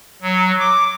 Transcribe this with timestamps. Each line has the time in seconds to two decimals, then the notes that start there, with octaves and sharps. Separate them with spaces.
0.22 F#3
0.60 D6